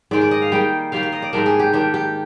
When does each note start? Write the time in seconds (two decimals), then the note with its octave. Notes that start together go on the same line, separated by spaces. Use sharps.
0.11 G#2 D#3 G#3 D5
0.21 D5
0.31 D#5
0.42 F5
0.52 D#3 G3 A#3 G5
0.92 D#3 G3 A#3 F5
1.03 F5
1.12 D#5
1.22 D5
1.33 G#2 D#3 G3 D4 A#4
1.46 G#4
1.60 G4
1.73 G#2 D#3 G3 D4 G4
1.94 G4